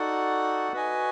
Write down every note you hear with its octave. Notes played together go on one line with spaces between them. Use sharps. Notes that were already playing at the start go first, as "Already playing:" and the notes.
Already playing: D#4 F#4 A4 D5 F#5
F#4 B4 D#5 G#5